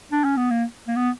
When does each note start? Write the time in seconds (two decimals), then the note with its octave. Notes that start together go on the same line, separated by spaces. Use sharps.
0.12 D4
0.24 C#4
0.37 B3
0.51 A#3
0.88 A#3
0.96 B3